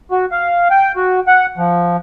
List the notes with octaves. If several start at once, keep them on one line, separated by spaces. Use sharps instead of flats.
F#4
F5
G5
F#4
F#5
F3